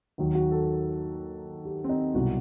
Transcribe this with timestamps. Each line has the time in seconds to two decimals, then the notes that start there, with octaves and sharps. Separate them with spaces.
0.18 D#2 D#3 F#3
0.35 F#4
0.51 A4
1.65 G4
1.84 C4
1.89 D#4
2.15 C2 B2 F#3 F#4